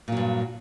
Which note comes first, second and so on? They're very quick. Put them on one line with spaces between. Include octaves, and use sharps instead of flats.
A#2 F#3 G2